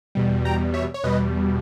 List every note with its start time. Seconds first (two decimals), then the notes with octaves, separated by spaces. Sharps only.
0.15 E2 B2 G3
0.45 G5 A#5
0.74 C#5 E5
0.94 C#5
1.04 E2 B2 G3 B4 D#5